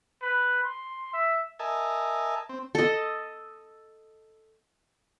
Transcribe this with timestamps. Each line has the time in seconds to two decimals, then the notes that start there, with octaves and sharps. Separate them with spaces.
0.22 B4
0.64 C6
1.14 E5
1.59 A#4 D#5 E5 G#5 A5
2.49 C4
2.75 A4 D#5